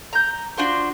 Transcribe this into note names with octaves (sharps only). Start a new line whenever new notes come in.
A#5 G6
D4 F4 F#4 C5